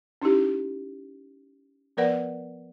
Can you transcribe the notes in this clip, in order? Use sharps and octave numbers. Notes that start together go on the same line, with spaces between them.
C#4 D#4 E4 G4
F3 B3 A#4 B4 D5 F#5